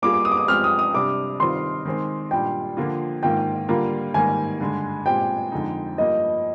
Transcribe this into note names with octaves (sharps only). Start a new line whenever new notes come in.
G3 A#3 F4 G#4 D6
D6
D#6
D6
D#6
F3 G#3 C4 G4 F6
D#6
D#6
C3 G3 D4 D6
D#3 G3 C4 F4 C6
D#3 G#3 C4
A#2 G3 D4 G5
D3 F3 A#3 F4
G#2 D#3 A#3 F4 G5
D3 G3 A#3 F4 A#4
G#2 D#3 G3 A#3 G#5
G2 D3 G#3
A#2 G#3 C4 G4 G5
F2 D3 G#3 D#4
G2 F3 A#3 D#5